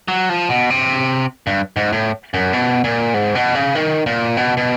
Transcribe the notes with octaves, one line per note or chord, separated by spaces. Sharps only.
F#3
F3
B2
C3
G2
G#2
A2
F#2
B2
A#2
G#2
B2
C#3
D#3
A#2
B2
B2